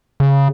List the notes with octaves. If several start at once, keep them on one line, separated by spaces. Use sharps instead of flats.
C#3